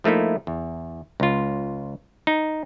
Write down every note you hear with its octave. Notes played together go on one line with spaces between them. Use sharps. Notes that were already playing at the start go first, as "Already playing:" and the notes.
F3 A3 A#3 D#4 E4
E2
C#2 F4
D#4